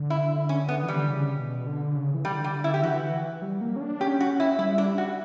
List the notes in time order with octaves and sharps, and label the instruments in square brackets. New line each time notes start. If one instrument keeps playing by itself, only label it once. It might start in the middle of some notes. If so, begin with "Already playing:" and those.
Already playing: [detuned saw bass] D3
[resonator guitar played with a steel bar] E4
C#4
B3
[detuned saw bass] E3 [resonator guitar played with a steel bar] G3
[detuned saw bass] D3
C#3
B2
D3
C#3
E3
[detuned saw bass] D3 [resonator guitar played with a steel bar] G3
[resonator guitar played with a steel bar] G3
E4
G4
[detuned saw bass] E3 [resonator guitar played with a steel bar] F#4
[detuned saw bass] G3
A#3
C#4
D4
[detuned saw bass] C#4 [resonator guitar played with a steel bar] G4
[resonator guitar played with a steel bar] F#4
E4
[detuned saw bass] G3 [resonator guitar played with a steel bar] E4
[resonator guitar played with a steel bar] D4
F#4